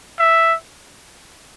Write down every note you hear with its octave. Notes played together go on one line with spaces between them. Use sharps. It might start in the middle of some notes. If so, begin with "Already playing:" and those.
E5